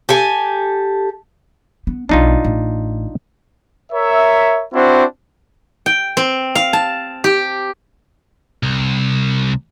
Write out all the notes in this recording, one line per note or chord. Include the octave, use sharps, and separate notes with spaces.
G4 A4 G#5
B3
B1 B3 D4 D#4 F4
A1
A#4 C#5 E5
C4 D4 E4 F#4 C5
G5
C4
F5
A5
G4
C2